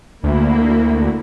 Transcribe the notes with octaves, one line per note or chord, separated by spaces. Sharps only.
D2 A#3 E4